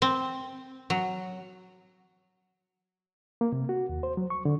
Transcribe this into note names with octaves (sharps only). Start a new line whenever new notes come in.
C4
F#3
A#3
C3
F#4
D#2
C5
F#3
C#6
D3